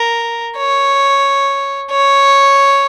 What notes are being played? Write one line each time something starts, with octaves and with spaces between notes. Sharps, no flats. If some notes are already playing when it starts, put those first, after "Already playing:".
Already playing: A#4
C#5
C#5